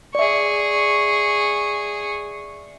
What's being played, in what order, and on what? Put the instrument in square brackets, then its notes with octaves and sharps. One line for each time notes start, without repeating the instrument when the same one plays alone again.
[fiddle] G#4 C#6 [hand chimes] D5 E5